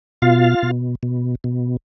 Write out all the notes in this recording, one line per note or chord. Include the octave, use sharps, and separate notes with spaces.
B2 F4 F5
B2
B2
B2